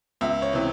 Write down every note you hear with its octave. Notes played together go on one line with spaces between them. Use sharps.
C#2 E5
C#5
C3 E3